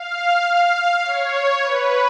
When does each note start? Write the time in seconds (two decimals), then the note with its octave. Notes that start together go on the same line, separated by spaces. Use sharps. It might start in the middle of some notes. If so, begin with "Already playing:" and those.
Already playing: F5
0.44 F5
1.03 C#5
1.61 B4